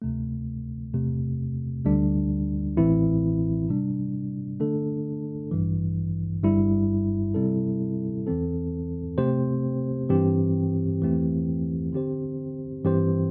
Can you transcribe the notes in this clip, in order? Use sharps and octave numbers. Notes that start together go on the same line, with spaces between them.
D2 C3 A3
E2 C3 A3
D2 D3 G3 D4
A1 A2 E3 C4 E4
C3 G3 D4
D3 A3 D4 A4
A1 G2 E3
G1 G2 G3 E4
C3 G3 C4 E4 A4
E2 E3 C4 A4
C3 A3 C4 G4 C5
G2 E3 C4 G4
E2 E3 A3 C4 G4
D3 C4 G4 C5
G2 E3 C4 G4 C5